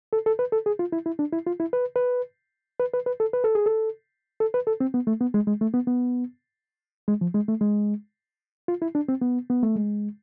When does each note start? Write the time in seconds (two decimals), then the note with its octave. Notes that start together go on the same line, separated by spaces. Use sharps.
0.13 A4
0.26 A4
0.39 B4
0.52 A4
0.66 G#4
0.79 F4
0.92 E4
1.06 E4
1.19 D4
1.33 E4
1.46 F4
1.60 E4
1.73 B4
1.96 B4
2.79 B4
2.94 B4
3.06 B4
3.20 A4
3.33 B4
3.44 A4
3.55 G#4
3.66 A4
4.40 A4
4.54 B4
4.67 A4
4.80 C4
4.94 B3
5.07 A3
5.21 B3
5.34 G#3
5.47 G#3
5.61 A3
5.74 B3
5.87 B3
7.08 G#3
7.21 F3
7.34 G#3
7.48 A3
7.61 G#3
8.68 F4
8.82 E4
8.95 D4
9.09 C4
9.21 B3
9.50 B3
9.62 A3
9.75 G#3